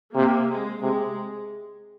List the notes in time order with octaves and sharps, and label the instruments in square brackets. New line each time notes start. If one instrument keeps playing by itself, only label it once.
[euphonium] C3 [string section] A#3
[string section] G#3
[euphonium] C3 [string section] G#3